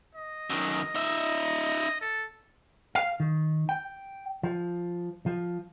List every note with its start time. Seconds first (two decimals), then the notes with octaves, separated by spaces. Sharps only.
0.15 D#5
0.50 F#2 D#3
0.95 D#4 E5
2.01 A4
2.95 F5
3.20 D#3
3.69 G5
4.43 F3
5.26 F3